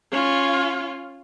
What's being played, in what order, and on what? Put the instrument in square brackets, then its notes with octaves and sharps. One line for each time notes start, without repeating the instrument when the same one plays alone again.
[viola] C#4 F4